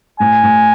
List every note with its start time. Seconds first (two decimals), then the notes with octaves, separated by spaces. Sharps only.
0.20 A2 G#5
0.43 A2